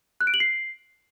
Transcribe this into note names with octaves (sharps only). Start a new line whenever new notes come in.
F#6
D7
F#7
C7